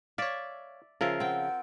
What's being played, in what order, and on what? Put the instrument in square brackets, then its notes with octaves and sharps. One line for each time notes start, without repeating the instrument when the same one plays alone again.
[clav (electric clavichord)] C#5 F5 [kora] D5 E5
[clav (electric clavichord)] C#3 F3 E5 [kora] F4 A#4
[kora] C4 G5 [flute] F#5